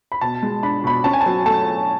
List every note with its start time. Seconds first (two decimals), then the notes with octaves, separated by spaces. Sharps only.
0.12 B5
0.21 B2 A5
0.43 G#3
0.63 D4 B5
0.84 B2 B5
1.04 C#4 A5
1.13 G#5
1.21 A5
1.26 F#3
1.46 A3 A5